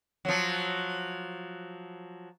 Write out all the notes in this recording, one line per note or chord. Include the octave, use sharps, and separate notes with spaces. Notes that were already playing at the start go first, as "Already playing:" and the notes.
F3 F#3